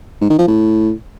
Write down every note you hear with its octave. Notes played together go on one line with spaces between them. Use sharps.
G#2
D#3
F3
A2